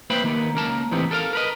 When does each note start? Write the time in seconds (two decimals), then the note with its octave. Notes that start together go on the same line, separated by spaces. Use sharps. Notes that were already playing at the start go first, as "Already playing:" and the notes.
0.10 A#3 B4 C5 E5 G5 B5
0.24 D#3 A#3 B3
0.54 C#2 A#3 A#4 A5
0.91 A2 E3 B3 C4 D#4 G4
1.11 A4 A#4 D#5 F5
1.33 A#4 B4 D#5